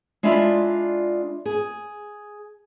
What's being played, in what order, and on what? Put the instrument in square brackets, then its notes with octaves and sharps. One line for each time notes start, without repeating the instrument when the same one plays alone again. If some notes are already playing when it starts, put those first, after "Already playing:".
[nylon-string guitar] G#3 D4 E4 F4 D5 E5
G#4